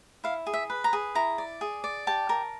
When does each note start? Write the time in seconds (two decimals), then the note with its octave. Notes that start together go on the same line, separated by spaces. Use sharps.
0.24 E4 F5
0.47 G#4
0.54 E5
0.70 B4
0.84 A#5
0.93 G#4
1.15 E4 A#5
1.38 D5
1.61 G#4
1.84 D5
2.07 G4 A5
2.29 A#4